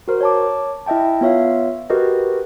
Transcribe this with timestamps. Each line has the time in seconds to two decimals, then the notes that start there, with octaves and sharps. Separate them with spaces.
0.08 F#4 A#4 C5
0.21 C#5 A5 D6
0.86 E4 D#5 E5 G5 A5
1.21 B3 F4 C#5 E5 F5
1.90 F#4 G4 A#4 B4 D#5